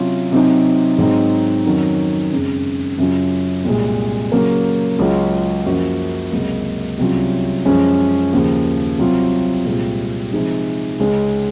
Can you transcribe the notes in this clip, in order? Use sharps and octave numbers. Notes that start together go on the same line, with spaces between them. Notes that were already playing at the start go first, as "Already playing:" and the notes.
Already playing: C3 F#3 C#4 F4
C3 F#3 C4 D#4
G#2 F#3 C4 D#4
F2 D#3 F#3 C#4
F#2 C#3 G#3 C4
F#2 C#3 F#3 C#4 F4
C2 A#2 G#3
C#3 F#3 A#3
C#2 C#3 F#3 C#4 F4
F#2 F3 A#3 C#4 F#4
C#2 C3 F#3 A#3
C2 C3 F#3 C#4 F4
F#2 F3 G#3 C#4
D#2 C#3 F3
C2 C3 F#3 C4 F4
C2 A#2 G#3 C4 F4
C3 F3 G#3 D#4
C#2 C#3 G#3 C#4